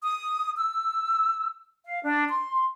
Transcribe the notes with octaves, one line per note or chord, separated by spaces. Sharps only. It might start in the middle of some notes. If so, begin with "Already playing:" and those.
D#6
E6
F5
D4
C6